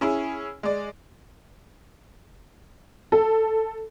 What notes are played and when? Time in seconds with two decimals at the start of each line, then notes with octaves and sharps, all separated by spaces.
0.01 C#4 E4 G#4
0.63 G#3 D5
3.12 A4